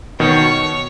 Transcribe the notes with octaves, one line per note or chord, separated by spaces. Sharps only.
B2 D#3 C#5